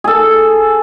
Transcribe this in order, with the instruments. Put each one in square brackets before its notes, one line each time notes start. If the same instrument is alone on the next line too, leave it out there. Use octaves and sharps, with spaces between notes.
[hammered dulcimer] G#4 A4